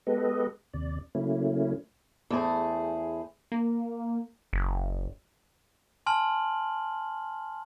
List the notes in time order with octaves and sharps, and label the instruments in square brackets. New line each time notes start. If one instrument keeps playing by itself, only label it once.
[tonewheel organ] G#3 B3 G4 A4 B4 D#5
D#2 C3 D5
C#3 F#3 A3 A#3 C#4 E4
[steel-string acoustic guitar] E2 A3 G#4 C5
[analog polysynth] A#3
[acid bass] F#1
[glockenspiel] G#5 A5 C6 F6 F#7